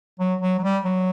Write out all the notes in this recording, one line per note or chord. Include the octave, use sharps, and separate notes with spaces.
F#3
F#3
F#3
G3
F#3